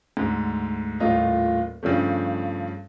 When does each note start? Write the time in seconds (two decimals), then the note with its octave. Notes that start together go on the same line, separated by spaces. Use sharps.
0.17 D2 G#2
1.00 D#1 A2 A3 F4 D#5
1.83 G2 C#3 F3 A3